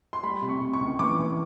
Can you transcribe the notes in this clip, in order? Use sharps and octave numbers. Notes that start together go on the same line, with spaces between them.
C6
G3 B5
C3
C#6
C3
C#6
C#2
E3 D6
E3